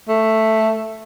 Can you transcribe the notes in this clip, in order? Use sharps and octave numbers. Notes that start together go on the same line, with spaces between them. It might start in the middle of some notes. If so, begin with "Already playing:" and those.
A3